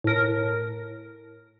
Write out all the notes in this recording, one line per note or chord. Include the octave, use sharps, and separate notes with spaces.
A2 A#4